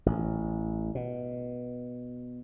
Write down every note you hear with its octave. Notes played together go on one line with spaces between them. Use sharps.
A1
B2